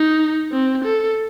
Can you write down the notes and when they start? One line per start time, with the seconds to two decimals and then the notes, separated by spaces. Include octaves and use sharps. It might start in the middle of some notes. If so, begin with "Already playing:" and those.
Already playing: D#4
0.52 C4
0.84 A4